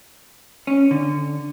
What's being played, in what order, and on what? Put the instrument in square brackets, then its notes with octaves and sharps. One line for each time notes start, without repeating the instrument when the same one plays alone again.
[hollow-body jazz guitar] C#4
D3